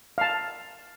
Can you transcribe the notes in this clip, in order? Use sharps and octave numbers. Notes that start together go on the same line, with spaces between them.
F5 A5